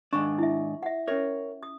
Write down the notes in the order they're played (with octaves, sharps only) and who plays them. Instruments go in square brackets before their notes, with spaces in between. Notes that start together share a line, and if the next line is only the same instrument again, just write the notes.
[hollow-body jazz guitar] G#2 D#3 D4 [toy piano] C#6
[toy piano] E4 E5
E5 F#5
[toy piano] C#4 E5 [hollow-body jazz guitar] A#4 C#5
[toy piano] D#6